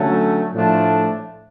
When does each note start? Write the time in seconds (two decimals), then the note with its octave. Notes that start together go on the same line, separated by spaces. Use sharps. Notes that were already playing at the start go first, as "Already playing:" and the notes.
Already playing: D3 F#3 A3 C#4
0.55 A2 F3 A3 D4